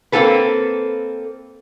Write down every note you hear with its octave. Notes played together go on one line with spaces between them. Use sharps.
A#3 C4 F4 G4 A4 B4